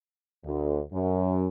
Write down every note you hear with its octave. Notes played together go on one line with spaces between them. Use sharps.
D2
F#2